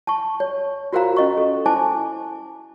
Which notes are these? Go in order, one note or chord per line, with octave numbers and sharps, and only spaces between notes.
A5 C#6
C#5
F4 F#4 A#4 C5 F5 A#5
C#4 D#5 C#6
A4
E4 C5 G#5 A5 D6